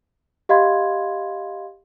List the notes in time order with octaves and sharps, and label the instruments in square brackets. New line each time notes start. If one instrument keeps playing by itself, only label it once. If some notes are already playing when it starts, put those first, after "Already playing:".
[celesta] G4 D#5 F5 B5 C6 G#6